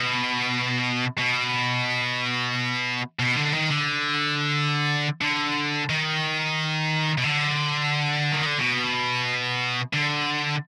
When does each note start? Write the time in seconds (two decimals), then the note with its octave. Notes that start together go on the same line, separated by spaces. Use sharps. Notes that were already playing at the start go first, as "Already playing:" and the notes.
Already playing: B2
1.18 B2
3.19 B2
3.36 D3
3.53 D#3
3.70 D3
5.22 D3
5.90 D#3
7.18 B2
7.24 D3
8.32 D#3
8.45 D3
8.58 B2
9.93 D3